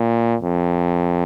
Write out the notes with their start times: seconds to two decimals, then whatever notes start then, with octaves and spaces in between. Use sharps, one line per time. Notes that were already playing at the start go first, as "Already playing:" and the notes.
Already playing: A#2
0.42 F2